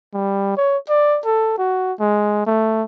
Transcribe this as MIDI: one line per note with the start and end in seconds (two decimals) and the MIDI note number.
0.14 0.56 55
0.57 0.77 73
0.89 1.19 74
1.25 1.56 69
1.58 1.93 66
2.00 2.45 56
2.46 2.83 57